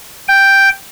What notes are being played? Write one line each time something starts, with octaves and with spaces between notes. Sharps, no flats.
G5